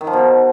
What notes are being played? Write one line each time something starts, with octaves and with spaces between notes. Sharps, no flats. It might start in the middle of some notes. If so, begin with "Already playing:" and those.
D#3
F3
B2